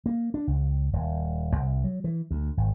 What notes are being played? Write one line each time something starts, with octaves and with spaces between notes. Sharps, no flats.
A#3
D4
C#2
D#1
C2
F#3
E3
D2
G#1